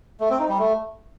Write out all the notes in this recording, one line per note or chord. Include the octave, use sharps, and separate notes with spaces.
A3
C4
D#4
G3
A3